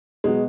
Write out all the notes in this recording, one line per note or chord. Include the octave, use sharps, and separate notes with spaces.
B2 F#3 G#3